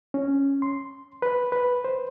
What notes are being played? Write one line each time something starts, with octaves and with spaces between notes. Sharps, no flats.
C#4
C6
B4
B4
C5